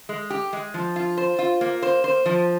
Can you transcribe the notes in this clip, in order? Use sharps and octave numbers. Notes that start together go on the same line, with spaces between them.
G#3
G4
G#3
F3
F4
C5
F4
A#3
C5
C5
F3